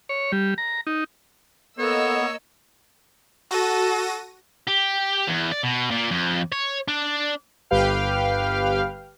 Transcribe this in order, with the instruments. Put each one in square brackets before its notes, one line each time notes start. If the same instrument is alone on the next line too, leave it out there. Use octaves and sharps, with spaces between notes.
[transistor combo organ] C#5
G3
A#5
D#4
[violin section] A#3 D#5 E6 [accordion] B3 [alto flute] A4 [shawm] C#5
[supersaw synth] F#4 A#6 D#7 [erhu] A4
[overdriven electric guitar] G4
E2
D5
B2
A#2
F2
C#5
D4
[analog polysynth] G1 G4 B4 F5 G5 F6